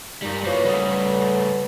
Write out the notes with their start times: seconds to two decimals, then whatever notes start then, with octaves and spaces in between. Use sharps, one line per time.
0.22 G2 A#2 G3 D#4
0.44 F3 A#3 E4 F#4 B4 C#5
0.65 G#2 C#3 F#3 G3 A3 C#5 D#6
0.92 B4